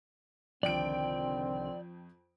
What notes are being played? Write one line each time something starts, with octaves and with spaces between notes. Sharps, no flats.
C2 F2 D3 D#3 C4 D5 G5 D7